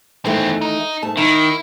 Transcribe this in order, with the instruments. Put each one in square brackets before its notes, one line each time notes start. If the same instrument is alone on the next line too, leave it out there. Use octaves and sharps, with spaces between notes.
[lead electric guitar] E2 C4 [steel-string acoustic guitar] D#3 E3 A3
[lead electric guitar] D#4
[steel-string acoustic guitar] G#2 A3 A5
[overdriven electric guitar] D#3 [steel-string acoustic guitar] D#4 [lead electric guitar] E4